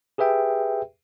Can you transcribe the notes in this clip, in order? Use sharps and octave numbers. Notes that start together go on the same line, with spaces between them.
G4 G#4 B4 E5 G5